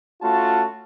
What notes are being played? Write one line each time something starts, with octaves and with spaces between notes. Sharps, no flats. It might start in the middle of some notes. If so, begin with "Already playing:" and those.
A3 C#4 F4 F#4 A5